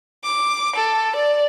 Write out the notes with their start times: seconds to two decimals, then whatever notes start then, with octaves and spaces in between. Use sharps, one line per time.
0.24 D6
0.76 A4
1.16 D5